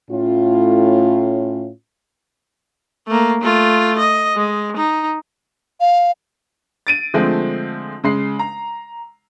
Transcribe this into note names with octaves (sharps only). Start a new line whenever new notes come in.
A2 C#4 F4
A3 A#3
A3 F4
D#5
G#3
D#4
F5
A6 D7 D#7
D3 F3 G#3 A3 C4
C#3 G#3 C7
A#5